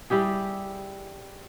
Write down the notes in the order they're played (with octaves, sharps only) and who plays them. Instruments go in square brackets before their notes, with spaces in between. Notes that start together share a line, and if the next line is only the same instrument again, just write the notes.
[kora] G3 E4 G4 G#4